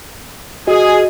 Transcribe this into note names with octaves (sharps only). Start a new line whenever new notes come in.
F#4 G#4 D#5